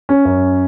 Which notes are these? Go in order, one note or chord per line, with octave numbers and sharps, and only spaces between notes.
C#4
F#2